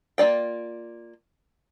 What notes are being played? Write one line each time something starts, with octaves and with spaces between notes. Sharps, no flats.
A#3 F4 D5 G5